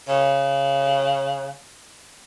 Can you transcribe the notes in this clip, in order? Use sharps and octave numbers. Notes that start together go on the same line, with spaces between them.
C#3